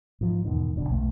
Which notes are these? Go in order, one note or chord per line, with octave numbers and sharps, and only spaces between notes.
G#2 F3
E2 G#2 B2 D#3
E1 F#2 B2 D3
B1 F2 C3 A3